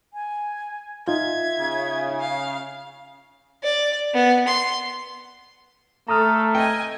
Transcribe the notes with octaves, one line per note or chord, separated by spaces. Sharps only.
G#5
D#4 F4 E5 G#6
C#3
F5
D5
B3
C6
A3 A4 A#5 D#6 F6
D#5 G5 G#5